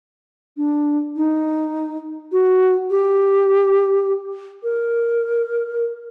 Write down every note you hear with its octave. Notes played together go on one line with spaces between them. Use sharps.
D4
D#4
F#4
G4
A#4